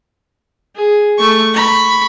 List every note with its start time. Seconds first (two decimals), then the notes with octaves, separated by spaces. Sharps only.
0.76 G#4
1.18 A3 C#6
1.54 B5 C#6